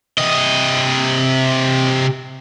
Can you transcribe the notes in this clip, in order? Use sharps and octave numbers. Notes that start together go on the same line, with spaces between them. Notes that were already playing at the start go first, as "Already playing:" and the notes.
C3 D#5